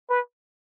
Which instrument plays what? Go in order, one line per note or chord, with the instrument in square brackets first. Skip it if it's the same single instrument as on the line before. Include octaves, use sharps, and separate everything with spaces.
[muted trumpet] B4